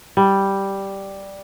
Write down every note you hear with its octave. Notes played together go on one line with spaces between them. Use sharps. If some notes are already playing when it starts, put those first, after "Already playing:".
G3